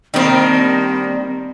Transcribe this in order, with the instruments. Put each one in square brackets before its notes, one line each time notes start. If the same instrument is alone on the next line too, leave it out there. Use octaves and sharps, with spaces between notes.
[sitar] D#3 A#3 C5 [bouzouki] G3 D4 [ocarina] C4